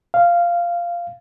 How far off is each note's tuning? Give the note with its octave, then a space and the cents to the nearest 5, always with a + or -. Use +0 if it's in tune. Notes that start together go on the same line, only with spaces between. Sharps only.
F5 -10